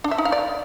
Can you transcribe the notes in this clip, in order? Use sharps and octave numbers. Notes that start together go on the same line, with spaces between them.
D4
E5
D#4
F5
D5